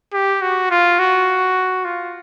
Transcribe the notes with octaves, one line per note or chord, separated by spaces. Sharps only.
G4
F#4
F4
F#4
F4